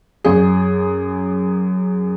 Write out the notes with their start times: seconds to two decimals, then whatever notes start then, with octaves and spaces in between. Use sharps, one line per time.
0.24 F#2 G#4